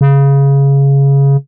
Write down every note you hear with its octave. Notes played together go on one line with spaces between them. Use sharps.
C#3